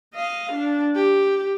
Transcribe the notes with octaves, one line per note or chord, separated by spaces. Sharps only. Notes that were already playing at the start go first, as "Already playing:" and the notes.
D#5 F5
D4
G4